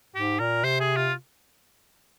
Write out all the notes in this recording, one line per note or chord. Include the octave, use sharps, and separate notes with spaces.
G#2 G4
A#2 A#4
C3 C5
G#4
F4